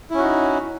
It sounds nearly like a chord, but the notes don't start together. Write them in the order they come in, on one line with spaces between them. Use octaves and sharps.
E4 C#4 F#4 D#4